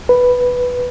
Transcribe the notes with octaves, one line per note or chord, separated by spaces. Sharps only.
B4